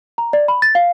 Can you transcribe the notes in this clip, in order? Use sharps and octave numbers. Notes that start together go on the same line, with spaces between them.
A#5
D5
B5
A6
F5